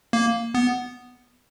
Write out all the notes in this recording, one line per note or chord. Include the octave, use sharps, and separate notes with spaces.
A#3
B3